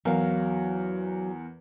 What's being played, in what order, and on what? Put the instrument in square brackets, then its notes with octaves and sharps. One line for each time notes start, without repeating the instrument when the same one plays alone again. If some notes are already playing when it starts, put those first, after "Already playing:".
[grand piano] E2 A#4 [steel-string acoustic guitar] F#3 F5